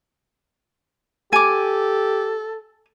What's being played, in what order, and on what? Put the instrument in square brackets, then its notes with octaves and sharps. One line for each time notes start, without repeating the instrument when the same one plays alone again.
[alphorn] G4 [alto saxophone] A4 [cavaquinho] G#5 D6